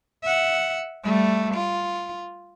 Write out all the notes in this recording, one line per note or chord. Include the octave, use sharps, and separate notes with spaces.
E5 F#5
G3 A3
F4